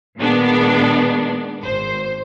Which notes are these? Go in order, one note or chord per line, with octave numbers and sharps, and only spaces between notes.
A#2 D#3 G#3 B3 D4
G#1 C5